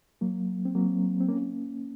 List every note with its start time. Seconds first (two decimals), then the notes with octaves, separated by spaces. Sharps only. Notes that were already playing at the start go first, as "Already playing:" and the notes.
0.21 F#3 A#3
0.65 C4
0.75 F#3 A#3
1.20 C4
1.28 A#3 C#4